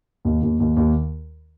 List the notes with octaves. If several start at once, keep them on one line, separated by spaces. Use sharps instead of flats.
D#2
D#2
D#2
D#2